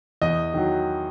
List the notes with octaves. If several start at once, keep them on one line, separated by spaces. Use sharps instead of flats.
E2 D#5
D#3 F#3